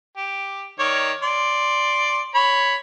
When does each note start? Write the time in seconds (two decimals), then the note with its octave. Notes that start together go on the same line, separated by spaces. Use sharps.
0.17 G4
0.79 D#3 C#5 D5
1.23 D5 C6
2.35 C#5 B5